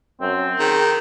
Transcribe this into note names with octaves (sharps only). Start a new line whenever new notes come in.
F#2 C4
D#3 G#4